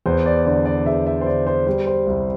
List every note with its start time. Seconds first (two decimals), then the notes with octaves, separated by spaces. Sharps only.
0.06 E2 C5
0.26 D5
0.46 D3 D5
0.65 D5
0.86 E2 E5
1.06 E5
1.21 C5
1.26 D3 D5
1.47 C5
1.67 G3 C5
1.86 C5
2.07 C2